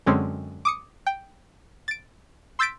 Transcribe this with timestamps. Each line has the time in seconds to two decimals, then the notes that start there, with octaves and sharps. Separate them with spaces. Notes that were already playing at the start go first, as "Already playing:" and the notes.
0.06 F#2 D3 G#3 C4 C#4
0.65 D6 D#6 C#7
1.07 G5
1.88 A6 D7
2.59 C6 E6 G6 A6 B6 D7